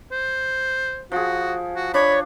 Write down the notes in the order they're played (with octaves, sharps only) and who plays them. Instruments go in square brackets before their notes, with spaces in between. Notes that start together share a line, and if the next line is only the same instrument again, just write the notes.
[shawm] C5
[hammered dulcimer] F3 G#4 [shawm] F#4
[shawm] F#4
[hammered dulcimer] D4 [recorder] C#5 [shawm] B5